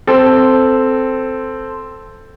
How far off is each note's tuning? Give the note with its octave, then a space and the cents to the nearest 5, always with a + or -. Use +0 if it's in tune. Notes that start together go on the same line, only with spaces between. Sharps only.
C4 -5 A4 +0